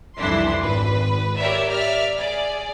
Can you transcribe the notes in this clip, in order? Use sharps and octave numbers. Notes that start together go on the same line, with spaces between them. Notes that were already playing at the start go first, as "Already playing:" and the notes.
C2 F2 E3 D4 E4 C6
G#1 B4
G4 A#4 C#5 D5 E5
D5 E5 F6
G#4 D5